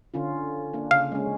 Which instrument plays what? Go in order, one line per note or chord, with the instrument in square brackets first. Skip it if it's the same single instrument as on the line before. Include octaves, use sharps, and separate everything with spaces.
[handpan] D3 C#4 F4
A#3 D4
[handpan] C#3 [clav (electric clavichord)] F5
[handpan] G#3 C#4